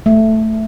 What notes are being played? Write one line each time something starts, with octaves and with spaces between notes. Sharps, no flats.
A3